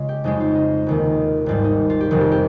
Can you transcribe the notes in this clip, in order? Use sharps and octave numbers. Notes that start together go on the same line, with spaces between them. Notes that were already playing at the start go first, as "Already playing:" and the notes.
Already playing: C#3 G#3 F4
G4
F2 C#3 G#3 D#4
F4
D#4
F1 D#2 D#3
G#1 G#2 G3 F4
D#4
F4
G4
F1 F2 D#3
G4
G4